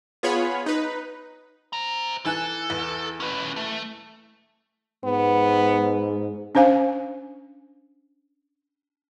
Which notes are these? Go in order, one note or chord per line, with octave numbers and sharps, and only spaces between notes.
B3 F4 G#4 C#5 B5
D#4 B4
C5 A#5
E3 A4 G#5 F#6
E2
C#4 B4
A3
G#2 B3
C#4 D4 C5 F5 G#5